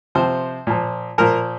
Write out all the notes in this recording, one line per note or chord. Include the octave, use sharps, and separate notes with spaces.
C3 F3 C5
A#2 F3
A#2 F3 A#4